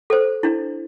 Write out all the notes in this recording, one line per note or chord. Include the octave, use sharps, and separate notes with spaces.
A4 C5
D4 E4